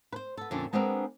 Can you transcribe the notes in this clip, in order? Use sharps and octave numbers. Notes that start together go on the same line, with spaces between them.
B4 C5
B3 A4
F2 A#2 D3 C#4 D4
G#3 B3 C4 D4 F#4 A#4